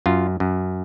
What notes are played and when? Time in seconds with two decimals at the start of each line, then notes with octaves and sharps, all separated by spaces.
0.06 F#2 F4
0.40 F#2